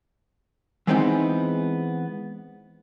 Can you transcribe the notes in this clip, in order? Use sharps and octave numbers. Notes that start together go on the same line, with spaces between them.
E3 G#3 B3 C4 D4 D#4